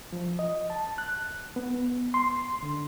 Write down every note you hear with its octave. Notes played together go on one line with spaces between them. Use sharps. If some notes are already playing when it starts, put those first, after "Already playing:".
F3
D#5
A5
F#6
B3
C6
D3